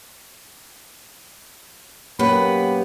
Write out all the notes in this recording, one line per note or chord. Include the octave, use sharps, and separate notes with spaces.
F#2 A#3 B3 G4 B4 B5